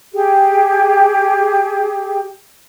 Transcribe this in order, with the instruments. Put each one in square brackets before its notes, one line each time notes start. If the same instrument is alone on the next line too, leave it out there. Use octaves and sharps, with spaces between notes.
[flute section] G4 G#4